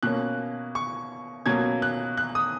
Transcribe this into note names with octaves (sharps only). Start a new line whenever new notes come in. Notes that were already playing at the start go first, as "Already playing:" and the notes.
B2 A#3 C#4 F#6
C#6
B2 F#3 A#3 C#4 G#6
F#6
F#6
D#6